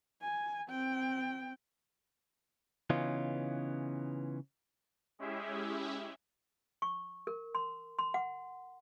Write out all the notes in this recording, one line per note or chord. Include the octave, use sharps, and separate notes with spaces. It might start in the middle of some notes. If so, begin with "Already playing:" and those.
G#5
C4 G5
C#3 E3 B3 C#4 D#4 F4
G#3 C#4 E4 G4 G#4 E5
C#6
A#4
C6
C6
F#5